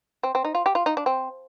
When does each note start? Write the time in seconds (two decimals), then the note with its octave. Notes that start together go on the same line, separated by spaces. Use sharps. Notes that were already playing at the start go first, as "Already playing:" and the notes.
0.23 C4
0.35 C4
0.45 D#4
0.55 F4
0.66 G4
0.75 F4
0.86 D#4
0.97 D4
1.06 C4